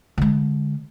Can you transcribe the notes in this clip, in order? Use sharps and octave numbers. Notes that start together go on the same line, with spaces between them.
D3 G#3